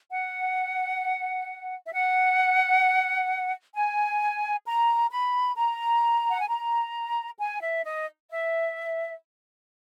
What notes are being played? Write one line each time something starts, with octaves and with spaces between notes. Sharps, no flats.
F#5
E5
F#5
G#5
A#5
B5
A#5
F#5
G#5
A#5
G#5
E5
D#5
E5